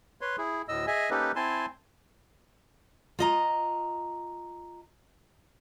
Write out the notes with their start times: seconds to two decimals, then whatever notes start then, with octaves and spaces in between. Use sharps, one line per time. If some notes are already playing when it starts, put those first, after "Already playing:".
0.21 B4 C#5 C6
0.38 E4 G#4
0.69 D2 A2 D#5 E6
0.87 G#4 D#5 E5 G#5
1.10 A#3 C#4 D#4 G4 A4 B4
1.36 C4 E4 G#5 A5 C6
3.19 F4 D#5 A#5